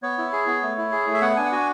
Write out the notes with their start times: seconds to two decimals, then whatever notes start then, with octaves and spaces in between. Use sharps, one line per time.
0.03 B3 C#5
0.18 E4
0.33 G#4
0.47 B3
0.63 A3
0.78 E4
0.92 G#4
1.07 A3
1.14 E5
1.22 B3 F#5
1.37 D4 G#5
1.46 F#5
1.52 F#4 G#5